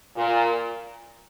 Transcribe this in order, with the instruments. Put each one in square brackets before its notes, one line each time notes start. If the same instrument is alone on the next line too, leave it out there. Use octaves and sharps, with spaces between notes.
[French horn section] A#2